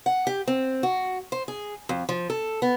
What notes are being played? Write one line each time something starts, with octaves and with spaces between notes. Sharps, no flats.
F#5
G4
C4
F#4
C5
G#4
F2
F3
A4
B3